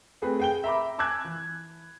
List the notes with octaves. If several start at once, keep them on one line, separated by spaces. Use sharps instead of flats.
A3 C4 G#4 B4
G#4 G5 G7
E5 A#5 B5 D6
G#5 A5 D6 E6 F#6 G#6
E3